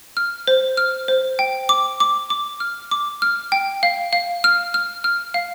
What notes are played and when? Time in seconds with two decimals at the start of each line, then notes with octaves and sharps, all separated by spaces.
0.17 F6
0.47 C5
0.77 F6
1.08 C5
1.39 G5
1.69 D6
2.00 D6
2.30 D6
2.60 F6
2.91 D6
3.22 F6
3.52 G5
3.83 F5
4.13 F5
4.44 F6
4.74 F6
5.04 F6
5.34 F5